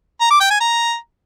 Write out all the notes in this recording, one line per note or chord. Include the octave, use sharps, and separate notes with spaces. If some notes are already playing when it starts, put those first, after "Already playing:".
A#5
D6
G5
G#5
A#5